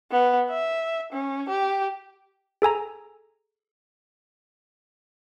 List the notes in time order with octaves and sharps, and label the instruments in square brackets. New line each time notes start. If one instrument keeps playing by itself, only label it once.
[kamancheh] B3
E5
C#4
G4
[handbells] G#4 A4 G#5 A#5